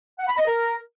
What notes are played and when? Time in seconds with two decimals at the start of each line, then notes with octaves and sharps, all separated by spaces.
0.19 F#5
0.28 B5
0.38 D#5
0.47 A#4